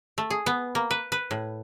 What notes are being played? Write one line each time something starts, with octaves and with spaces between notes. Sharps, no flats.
A3
G#4
B3
A#3
B4
B4
A2